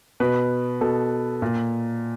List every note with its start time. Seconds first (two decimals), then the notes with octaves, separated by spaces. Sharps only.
0.20 B2 B4
0.81 B2 A4
1.42 A#2